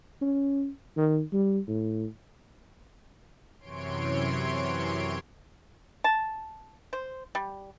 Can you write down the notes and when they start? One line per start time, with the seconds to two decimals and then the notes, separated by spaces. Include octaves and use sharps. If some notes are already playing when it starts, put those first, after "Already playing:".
0.21 C#4
0.97 D#3
1.33 G3
1.68 A2
3.59 F#2 C3 E3 C#5 C6 D7
6.04 A5
6.93 C5
7.35 G3